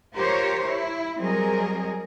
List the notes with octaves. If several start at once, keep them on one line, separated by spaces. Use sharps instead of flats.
F4 G4 A#4 C5 C#5
E4
F#3 G3 C4 G#4 A#4 D#5